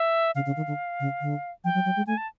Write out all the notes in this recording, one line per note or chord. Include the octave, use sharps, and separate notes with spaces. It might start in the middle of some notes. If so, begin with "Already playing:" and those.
Already playing: E5
C#3 F5
C#3
D#3
D3
C#3
D3
F3 G5
F#3
F#3
G#3
A3 G#5
A5